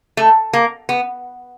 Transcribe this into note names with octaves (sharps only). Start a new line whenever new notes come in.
A3
A#3
B3